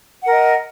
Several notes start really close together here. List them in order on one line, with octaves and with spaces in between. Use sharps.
F#5 A#4 D#5